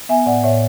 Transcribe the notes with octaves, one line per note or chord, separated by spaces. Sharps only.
B3 E5 G#5
A2 D5 F#5
A2 C#5 E5